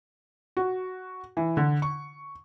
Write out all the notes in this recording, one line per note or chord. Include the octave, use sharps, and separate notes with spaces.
F#4
E3
D3
C#6